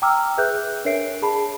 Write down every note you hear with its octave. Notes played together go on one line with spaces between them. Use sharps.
G5 A#5 D6 E6 F6
G#4 B4 E5 F#6 G6
D4 A#4 C#5 E5 C7 D7
G#4 A5 B5